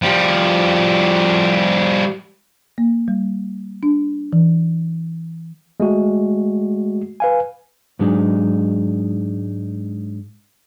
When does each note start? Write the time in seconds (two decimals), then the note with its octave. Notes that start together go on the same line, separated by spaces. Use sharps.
0.02 F3 G3
2.78 A#3
3.08 G3
3.83 D4
4.33 E3
5.80 G#3 A3 F#4
7.20 B4 F5 G#5
7.99 G#2 F#3 G#3 D4 D#4